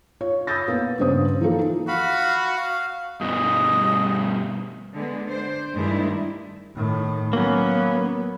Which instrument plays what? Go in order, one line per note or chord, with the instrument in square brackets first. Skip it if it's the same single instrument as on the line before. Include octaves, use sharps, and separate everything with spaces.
[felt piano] F4 C#5
B5 D#6 E6 G6 A6 A#6
A#3 B3
G2 C#3 B3 C5 D#6
E3 F3 A#3 D#4 F4 A4
[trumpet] F#4 [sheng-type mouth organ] F5 B5
[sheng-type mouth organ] F5
[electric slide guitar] G2 B2 G3 [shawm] D#5
[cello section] D3 G#3 B3
D4 C5
G2 D#3 G#3 A3 D4 E4
[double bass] A2 D#3
[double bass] F#3 B3 [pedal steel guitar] A#3 C#4